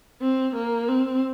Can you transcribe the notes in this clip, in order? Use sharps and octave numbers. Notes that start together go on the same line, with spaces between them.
C4
A#3
C4